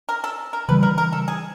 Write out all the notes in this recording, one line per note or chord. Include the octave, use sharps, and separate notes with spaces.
A#4
A4
A#4
C#3 E3 G3 B4
A#4
A#4
A4
G#4